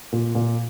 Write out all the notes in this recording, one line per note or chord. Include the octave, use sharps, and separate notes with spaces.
A#2
A#2